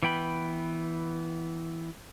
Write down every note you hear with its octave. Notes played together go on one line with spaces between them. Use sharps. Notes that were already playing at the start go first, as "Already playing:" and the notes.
E3 B3 G5 B5